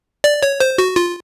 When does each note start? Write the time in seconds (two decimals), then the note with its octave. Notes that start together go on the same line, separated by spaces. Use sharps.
0.24 D5
0.43 C#5
0.60 C5
0.78 F#4
0.96 F4